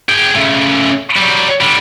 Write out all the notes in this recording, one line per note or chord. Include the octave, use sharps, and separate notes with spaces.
G#4 G5
C#3 A3
F#3 G3
D3 G3